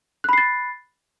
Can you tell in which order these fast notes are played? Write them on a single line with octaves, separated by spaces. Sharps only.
F#6 B5 C7 A6